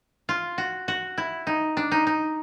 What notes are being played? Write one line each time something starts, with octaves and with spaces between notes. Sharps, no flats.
F4
F#4
F#4
E4
D#4
D4
D#4
D#4